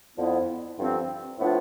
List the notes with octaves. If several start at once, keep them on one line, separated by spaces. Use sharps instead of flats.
F2 D3 F3 B3 E4
G2 D3 F3 C4
A2 F3 B3 D4 F4